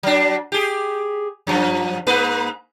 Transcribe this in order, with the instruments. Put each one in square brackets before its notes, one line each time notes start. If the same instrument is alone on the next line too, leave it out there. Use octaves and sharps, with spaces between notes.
[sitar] F#3 D4
G4 G#4
F#2 F3
G#2 A#3 B4